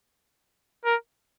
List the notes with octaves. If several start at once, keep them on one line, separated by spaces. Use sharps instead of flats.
A#4